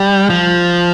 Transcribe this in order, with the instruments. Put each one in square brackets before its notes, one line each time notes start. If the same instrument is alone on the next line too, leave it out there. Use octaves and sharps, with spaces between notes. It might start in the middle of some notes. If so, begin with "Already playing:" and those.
Already playing: [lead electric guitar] G3
F3